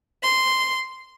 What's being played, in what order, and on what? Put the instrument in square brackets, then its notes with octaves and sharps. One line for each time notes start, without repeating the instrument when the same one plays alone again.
[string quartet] C6